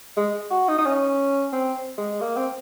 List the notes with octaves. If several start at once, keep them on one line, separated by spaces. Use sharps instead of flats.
G#3
F#4
D#4
D#4
C#4
C4
G#3
A#3
C4